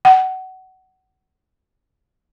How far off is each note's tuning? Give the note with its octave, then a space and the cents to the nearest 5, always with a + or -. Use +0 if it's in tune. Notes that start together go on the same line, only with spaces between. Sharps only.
F#5 +25